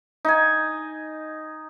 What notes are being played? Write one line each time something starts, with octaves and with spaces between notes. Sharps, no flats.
D#4 G#5